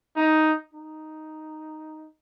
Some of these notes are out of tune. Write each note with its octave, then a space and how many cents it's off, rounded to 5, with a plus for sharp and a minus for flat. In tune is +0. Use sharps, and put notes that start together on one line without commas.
D#4 +5
D#4 +0